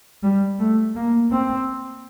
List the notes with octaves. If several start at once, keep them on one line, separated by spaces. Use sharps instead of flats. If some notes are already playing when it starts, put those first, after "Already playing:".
G3
A3
A#3
C4